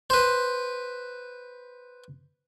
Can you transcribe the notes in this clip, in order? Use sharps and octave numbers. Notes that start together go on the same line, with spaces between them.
B4 C5